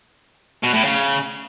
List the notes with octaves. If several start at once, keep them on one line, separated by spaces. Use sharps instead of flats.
B2
A2
C#3